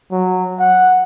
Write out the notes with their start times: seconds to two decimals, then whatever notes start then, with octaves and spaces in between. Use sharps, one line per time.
0.11 F#3
0.59 F#5